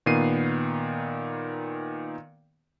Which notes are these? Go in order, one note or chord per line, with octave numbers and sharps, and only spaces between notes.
A#2 D#3 B3 C7 D#7